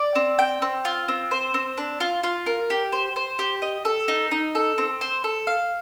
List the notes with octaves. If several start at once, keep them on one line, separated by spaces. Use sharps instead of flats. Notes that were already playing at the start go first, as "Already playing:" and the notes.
Already playing: D5
C4
G5
C4
F4
C4
C5
C4
D4
F4
F4
A#4
G4
C5
C5
G4
D#5
A4
D#4
D#4
A4
C4
C5
A4
F5